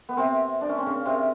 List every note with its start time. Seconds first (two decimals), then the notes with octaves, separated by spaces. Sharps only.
0.09 B3
0.17 C3 C4
0.61 D4
0.69 C#4
0.78 C4
0.86 C#3 C#4
1.05 C3 C4